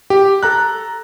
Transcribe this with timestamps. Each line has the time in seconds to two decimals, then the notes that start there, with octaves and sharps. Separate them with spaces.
0.10 G4
0.43 A4 A#5 F#6